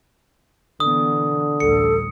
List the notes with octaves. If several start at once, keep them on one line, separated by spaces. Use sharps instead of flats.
B2 D3 E3 B3 D#6
A1 D2 G3 A4 C#7